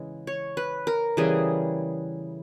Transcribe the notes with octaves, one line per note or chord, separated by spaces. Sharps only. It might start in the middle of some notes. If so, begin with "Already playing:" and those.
Already playing: C#3 E3 G#3
C#5
B4
A#4
C#3 E3 G3 G#4